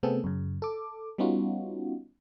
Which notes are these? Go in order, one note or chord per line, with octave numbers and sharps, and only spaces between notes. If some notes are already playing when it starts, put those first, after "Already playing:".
C3 A3 B3 C4 G#4 A4
F#2 C#3
A4 D6
G3 B3 C#4 D#4 F4 F#4